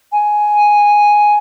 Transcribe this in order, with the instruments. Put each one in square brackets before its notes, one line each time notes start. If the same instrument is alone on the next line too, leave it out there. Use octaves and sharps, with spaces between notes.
[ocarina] G#5